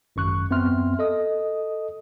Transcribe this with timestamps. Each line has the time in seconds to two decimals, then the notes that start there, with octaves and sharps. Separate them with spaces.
0.16 G#1 F#2 C#6 F#6
0.50 F#2 B3 C4 E5 C6 F6
0.99 A4 D#5 D#6